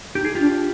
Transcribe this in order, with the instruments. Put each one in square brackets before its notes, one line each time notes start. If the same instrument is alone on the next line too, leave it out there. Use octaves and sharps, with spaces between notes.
[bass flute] D#4 [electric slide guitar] G4
[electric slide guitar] G#4
[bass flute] D4 [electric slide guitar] F4 G4